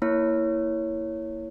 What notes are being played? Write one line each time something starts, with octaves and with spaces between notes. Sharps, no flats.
A#3 E4 C#5